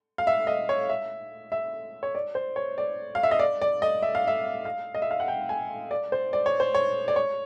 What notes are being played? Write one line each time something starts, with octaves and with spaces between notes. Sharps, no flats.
F5
E5
D#5
C#5
E5
E5
C#5
D5
C5
C#5
D5
F5
E5
D#5
D5
D5
D#5
E5
F5
E5
F5
D#5
E5
F5
F#5
G5
G#5
D5
C5
D5
C#5
C5
C#5
D5
C#5